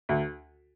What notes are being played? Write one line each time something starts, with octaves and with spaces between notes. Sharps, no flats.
D2